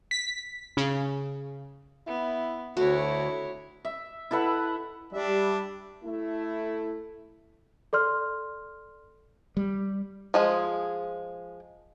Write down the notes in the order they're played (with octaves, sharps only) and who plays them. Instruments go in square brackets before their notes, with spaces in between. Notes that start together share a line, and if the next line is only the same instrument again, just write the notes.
[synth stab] B6
C#3
[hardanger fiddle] B3 [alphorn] E4
[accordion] D2 [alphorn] A3 [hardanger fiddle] E4 C#5 [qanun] F#4
[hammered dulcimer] E5
E4 A4 B4 F#5
[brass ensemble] G3 [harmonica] D4 E5
[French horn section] A3 E4
[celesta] A4 D5 C6 F6
[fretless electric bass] G3
[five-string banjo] F3 G#3 G#4